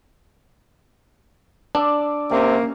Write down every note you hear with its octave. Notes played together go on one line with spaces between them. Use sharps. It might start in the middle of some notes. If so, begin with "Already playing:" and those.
D4 D5 E6
C3 A#3 C#4